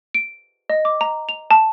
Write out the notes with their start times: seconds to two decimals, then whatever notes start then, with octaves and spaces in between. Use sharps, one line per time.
0.15 D7
0.70 D#5
0.85 D6
1.01 A#5
1.29 F7
1.51 A5